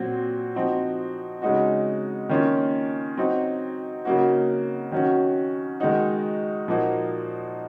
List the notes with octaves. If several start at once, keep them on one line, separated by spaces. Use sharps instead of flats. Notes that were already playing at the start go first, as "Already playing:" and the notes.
Already playing: A#2 F#3 C4 F#4
F3 C4 D#4 F#4
C#3 G#3 D#4 F#4
D#3 A#3 C#4 F4
F#3 C4 D#4 F#4
C#3 F#3 A#3 D#4 F#4
D#3 F#3 C#4 F#4
D#3 G#3 D#4 F#4
A#2 F3 A#3 D#4 F#4